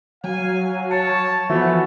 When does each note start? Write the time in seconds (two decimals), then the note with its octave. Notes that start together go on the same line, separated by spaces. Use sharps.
0.24 F#3 F5 G#5
0.91 C#5 A5 C#7
1.50 E3 F3 A3 B3 F#4 E5